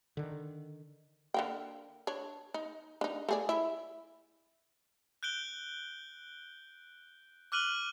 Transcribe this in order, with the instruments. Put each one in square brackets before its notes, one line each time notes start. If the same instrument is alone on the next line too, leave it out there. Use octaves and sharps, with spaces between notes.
[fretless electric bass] D3 D#3
[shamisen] D3 A#3 G5
D4 C#5
D#4
D4 D#4
A3 G#4 D5
E4 E5
[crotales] F#6 G6 D7 G7
D6 F6 F#6 D#7 F#7 G7